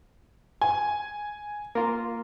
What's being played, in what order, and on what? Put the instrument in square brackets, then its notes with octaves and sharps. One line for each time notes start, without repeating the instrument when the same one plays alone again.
[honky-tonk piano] G#5
[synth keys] A#3 F4